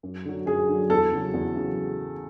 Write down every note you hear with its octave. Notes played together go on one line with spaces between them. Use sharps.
F#2
D3 F#3
F#2 G#4
D3 F#3
E2 A4
C#3 F#3
E2
C#3 F#3